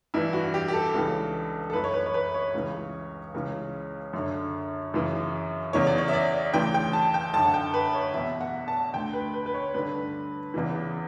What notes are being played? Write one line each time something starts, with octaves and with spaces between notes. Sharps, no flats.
G2 E3 E4
F#4
G4
G4
A4
C#2 C#3 E3
A4
F#2 E3 B4
C#5
B4
C#5
B4
C#5
C#2 C#3 E3
C#2 C#3 E3
F#2 D3
F#2 C#3 E3
E2 C#3 E3 C#5
D5
C#5
E5
D5
D2 C#3 E3 G5
G5
A5
G5
F#2 D3 A5
F#5
G5
B4
C#5
E2 B2 E5
F#5
A5
D2 D3 G5
B4
B4
B4
C#5
G2 D3 B4
E2 C#3 E3